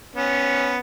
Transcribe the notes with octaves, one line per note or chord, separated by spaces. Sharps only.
B3 C#4